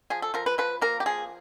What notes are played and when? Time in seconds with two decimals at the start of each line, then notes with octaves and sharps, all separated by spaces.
0.10 F3 G#4
0.22 A4
0.34 F3 A#4
0.46 B4
0.58 F3 B4
0.81 A#3 A#4
1.00 G4
1.06 F3 G#4